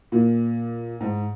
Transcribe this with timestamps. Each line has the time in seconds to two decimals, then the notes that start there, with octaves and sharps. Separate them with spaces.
0.12 A#2
1.01 G#2